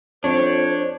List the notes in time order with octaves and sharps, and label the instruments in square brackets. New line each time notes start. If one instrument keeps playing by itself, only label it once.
[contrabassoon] F2 [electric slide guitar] D4 [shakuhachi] C5 [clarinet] C#5